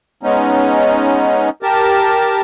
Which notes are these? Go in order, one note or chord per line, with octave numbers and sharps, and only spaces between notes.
G#3 B3 C#4 D#4
G4 A#4 A5